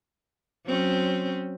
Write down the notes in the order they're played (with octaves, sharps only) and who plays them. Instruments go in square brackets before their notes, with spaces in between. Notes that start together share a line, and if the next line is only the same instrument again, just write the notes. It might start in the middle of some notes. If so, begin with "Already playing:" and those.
[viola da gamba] F#3 C4 C#4